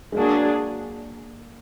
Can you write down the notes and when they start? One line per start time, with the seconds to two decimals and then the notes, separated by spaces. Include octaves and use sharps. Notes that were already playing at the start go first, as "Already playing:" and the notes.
0.12 G#3
0.16 F#3 A#3 D4 G#4